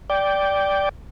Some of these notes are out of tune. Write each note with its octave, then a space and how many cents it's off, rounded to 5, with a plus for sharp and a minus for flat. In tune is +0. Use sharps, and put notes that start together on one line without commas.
D5 -10 G5 +0